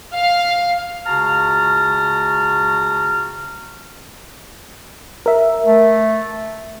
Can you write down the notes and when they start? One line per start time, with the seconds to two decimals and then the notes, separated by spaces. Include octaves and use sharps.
0.13 F5
1.06 C#2 C#3 F#4 A5 A#5 F6
5.26 A#4 E5
5.66 A3